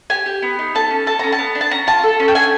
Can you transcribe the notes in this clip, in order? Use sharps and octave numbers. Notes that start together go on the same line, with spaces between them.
G4 G#5
G4
B3
D#4
A4 A5
C#4
A4 A5
C#4 A#5
A5
B3
D4
A5
C#4 A#5
F4 A5
A4
C#4
G5
D4 G#5